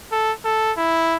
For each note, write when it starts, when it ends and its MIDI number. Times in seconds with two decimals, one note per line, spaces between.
0.12 0.32 69
0.45 0.72 69
0.78 1.17 64